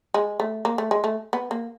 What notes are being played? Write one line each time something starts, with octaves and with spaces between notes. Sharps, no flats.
G#3
A3
A#3
A3
G#3
A3
B3
A#3